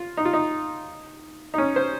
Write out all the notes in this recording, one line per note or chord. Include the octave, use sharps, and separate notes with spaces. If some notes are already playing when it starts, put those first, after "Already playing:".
Already playing: F4
D#4
F4
D#4
D#4
C#4
C5